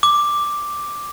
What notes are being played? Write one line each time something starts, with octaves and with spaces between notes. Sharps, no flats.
D6